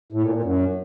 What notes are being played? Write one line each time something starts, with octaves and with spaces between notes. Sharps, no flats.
A2
A#2
A#2
F#2